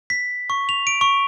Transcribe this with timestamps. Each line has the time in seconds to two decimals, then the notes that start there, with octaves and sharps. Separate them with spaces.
0.10 B6
0.50 C#6
0.69 F7
0.87 D7
1.01 C#6